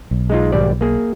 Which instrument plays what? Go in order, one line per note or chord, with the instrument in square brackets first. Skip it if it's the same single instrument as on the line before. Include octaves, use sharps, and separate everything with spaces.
[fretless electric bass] B1
[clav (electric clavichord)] G#3 D#4 F4
G#1 G3 D5
A#3 G#4